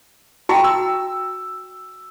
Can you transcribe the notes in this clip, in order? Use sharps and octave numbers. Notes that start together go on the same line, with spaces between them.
F#4 G5 A5 A#5 C#6
E6